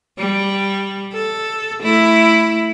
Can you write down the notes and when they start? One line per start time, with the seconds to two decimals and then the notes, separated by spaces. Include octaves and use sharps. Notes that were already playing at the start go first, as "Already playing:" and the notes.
0.18 G3
1.13 A4
1.83 A3 E4